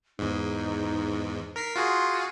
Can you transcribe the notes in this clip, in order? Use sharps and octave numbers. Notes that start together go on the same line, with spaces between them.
E2 G#2 D#4
A#4 B6 C7
F4 F#4 G#4 C6